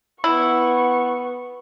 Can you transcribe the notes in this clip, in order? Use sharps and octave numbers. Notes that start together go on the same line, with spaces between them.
B3 E4 C#6